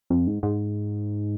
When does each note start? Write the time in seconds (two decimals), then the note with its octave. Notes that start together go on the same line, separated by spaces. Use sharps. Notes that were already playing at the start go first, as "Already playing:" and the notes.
0.10 F2
0.27 G#2
0.43 G#2